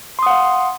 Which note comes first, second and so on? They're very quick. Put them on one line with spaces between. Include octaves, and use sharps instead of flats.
C6 D#6 F#5 F5